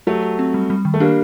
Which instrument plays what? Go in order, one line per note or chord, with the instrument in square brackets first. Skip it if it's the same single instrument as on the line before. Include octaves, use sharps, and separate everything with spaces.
[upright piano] F#3 A3 [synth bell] G4
[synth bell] G4
C4
G3
G3
D#3
[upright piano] A3
[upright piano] G3 A#3 [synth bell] D4